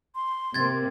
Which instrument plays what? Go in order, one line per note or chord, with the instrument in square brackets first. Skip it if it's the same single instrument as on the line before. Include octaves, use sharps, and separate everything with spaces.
[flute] C6
[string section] C3 A#3 [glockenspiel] G#6 A6